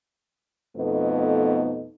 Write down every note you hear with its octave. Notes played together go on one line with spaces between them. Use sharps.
F2 B2 A3 B3 D#4